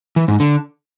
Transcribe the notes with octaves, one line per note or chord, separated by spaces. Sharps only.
E3
G#2
D3